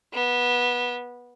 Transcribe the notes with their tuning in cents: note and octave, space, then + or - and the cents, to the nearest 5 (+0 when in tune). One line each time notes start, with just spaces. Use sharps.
B3 -15